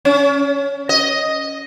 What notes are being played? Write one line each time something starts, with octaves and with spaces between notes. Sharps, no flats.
C#4
D#5